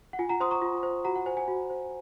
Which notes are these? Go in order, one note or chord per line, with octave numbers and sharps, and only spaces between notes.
F#5
F4 G#5
F#5 A#5
C5 C6 D#6
A#5 C#6
F4
C5
F#4 F#5 A#5
F#5
C5 G#5
G#5
F#4
C5